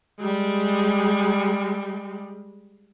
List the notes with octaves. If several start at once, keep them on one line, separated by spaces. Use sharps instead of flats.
G3 G#3